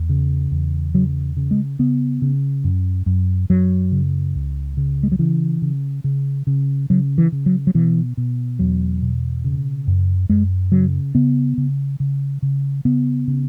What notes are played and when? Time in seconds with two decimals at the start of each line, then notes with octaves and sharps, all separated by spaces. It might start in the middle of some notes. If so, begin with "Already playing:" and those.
Already playing: E2
0.09 C#3
0.51 E2
0.94 C#3 F#3
1.37 C#3
1.51 G#3
1.79 C#3 B3
2.22 C#3
2.64 F#2
3.06 F#2
3.50 F#2 F#3
3.92 C#3
4.35 C#2
4.77 C#3
5.03 G#3
5.12 F#3
5.19 C#3 E3
5.62 C#3
6.04 C#3
6.47 C#3
6.90 C#3 F#3
7.18 E3
7.32 C#3
7.46 F#3
7.67 F#3
7.74 B2 E3
8.17 B2
8.59 E2 F#3
9.02 B2
9.44 C#3
9.87 F#2
10.30 F#2 G#3
10.72 C#3 F#3
11.15 C#3 B3
11.58 C#3
12.00 C#3
12.42 C#3
12.85 C#3 B3
13.28 C#3